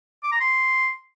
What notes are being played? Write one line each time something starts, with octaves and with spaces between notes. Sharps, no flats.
D6
A#5
C6